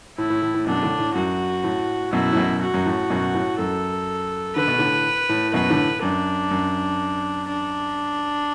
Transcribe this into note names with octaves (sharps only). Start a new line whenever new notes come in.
A2 E4
A2
A2
A2
F#2 B2 D4
A2 D3
A2
F#2 F#4
A2
F#2 B2 E4
A2
F#2 B2
F#4
F#2
A2
F#2 B2
A2
F#2 A4
D3 B4
B2
A2 D3
A2
F#2 B2 B4
A2 D3
F#2 D4
F#2
D4